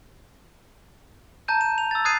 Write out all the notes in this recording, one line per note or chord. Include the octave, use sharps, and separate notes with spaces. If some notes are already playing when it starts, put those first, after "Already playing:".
A5 A#5 G6 D#7
E7
F7
E6 A6
D#6 F#6 G#6 A6 C7 D#7